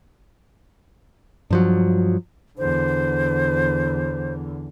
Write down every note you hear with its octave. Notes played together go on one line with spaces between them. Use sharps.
G2 F3 F#3
E2 D3 C5